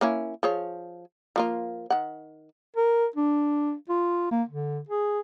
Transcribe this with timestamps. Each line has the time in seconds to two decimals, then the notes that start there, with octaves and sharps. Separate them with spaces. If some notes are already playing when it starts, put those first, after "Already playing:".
0.01 A#3 C#4 E4
0.43 F3 G#4 C#5
1.36 F3 A#3 F4
1.90 D#3 F#5
2.77 A#4
3.16 D4
3.89 F4
4.32 A#3
4.49 D3
4.89 G#4